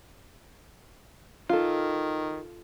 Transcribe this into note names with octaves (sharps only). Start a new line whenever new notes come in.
D#3 F4 A4